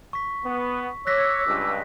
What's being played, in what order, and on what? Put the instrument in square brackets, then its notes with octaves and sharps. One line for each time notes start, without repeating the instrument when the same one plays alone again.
[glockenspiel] C#6 B6
[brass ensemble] B3
[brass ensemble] C#5 [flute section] D6 E6 [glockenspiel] F#6 A#6 B6
[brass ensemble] C#2 G2